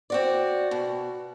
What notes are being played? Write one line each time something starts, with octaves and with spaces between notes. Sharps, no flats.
C4 F#4 D5
B2